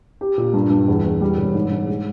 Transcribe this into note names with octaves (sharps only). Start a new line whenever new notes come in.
G4
A#2
G2
G2
E2
E2
G3
E1
G#2
G#2
G#3